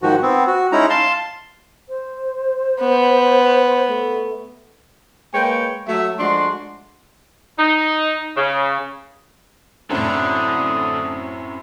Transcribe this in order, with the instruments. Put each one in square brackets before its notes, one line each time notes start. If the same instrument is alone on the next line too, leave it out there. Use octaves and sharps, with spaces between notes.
[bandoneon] G#2 D#3 F3 F#4
B3 C4
F#4
G#3 C#4 D#4 E4 A#5
F5 A5 C6
[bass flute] C5
[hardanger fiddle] B3
[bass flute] A3
[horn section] G#3 A#3 B4 C#5 G5
F#3 A3 E5
F3 G#3 A3 D4 F#4 C6
D#4
C#3
[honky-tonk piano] F#2 A2 [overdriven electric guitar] D3 [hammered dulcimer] C4 E4 [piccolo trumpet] D#6